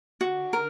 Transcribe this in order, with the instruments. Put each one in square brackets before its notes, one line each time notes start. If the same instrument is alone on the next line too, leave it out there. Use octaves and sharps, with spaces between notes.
[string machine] D3 D4 [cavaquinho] F#4
[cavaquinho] A#4